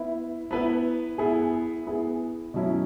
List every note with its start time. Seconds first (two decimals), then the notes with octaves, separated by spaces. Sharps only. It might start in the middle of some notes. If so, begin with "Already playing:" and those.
Already playing: B3 E4 B4 E5
0.51 B3 E4 B4 E5
1.18 B3 E4 G#4
1.86 B3 E4 G#4
2.54 B2 F#3 C#4 E4